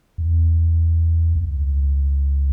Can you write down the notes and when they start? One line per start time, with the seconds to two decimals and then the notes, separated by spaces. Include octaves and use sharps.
0.18 E2
1.35 C#2